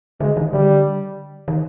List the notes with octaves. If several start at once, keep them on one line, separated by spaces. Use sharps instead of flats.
D3 G#3
D#3
D3 G3
D#3